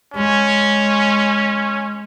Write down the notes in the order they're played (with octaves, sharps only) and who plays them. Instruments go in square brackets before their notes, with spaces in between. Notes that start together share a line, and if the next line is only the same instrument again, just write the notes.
[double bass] G#3 [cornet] C#4